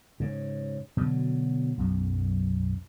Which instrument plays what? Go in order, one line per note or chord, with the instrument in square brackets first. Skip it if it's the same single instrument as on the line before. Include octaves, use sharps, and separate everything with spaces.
[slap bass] G#2 C#3
B2 D3 F#3
B1 F#2